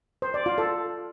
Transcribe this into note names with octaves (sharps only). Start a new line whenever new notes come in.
C5
D5
F4
A4